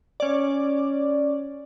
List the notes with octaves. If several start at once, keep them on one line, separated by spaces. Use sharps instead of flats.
C#4 D5